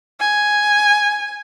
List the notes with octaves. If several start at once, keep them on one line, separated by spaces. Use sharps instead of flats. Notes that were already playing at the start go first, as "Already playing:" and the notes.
G#5